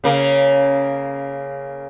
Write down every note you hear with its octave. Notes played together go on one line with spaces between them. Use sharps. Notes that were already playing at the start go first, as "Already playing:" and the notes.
C#3 A#3